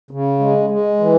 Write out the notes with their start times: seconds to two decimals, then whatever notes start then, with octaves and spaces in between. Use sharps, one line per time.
0.11 C#3
0.39 G#3
0.70 G#3
1.00 E3